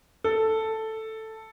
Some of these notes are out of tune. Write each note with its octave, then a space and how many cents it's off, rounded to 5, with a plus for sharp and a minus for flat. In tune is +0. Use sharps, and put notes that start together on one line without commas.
A4 +5